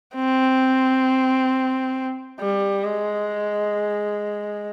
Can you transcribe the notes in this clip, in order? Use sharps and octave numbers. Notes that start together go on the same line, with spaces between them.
C4
G3
G#3